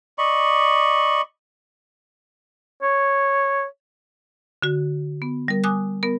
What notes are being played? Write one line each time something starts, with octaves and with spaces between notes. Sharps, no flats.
D5 D#5 B5 C#6
C#5
D3 F#4
B3
G3 A#4
G#5 D6 D#6 F#6
B3 A#4